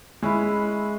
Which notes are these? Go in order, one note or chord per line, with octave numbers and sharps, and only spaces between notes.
G#3 C#4 E4 B4